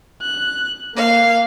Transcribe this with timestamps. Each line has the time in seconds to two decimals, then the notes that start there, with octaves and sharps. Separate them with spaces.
0.22 F#6
0.95 A#3 F5